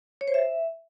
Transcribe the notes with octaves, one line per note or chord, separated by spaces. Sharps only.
C#5
C5
E5